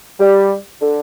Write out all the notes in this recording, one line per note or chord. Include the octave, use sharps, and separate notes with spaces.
G3
D3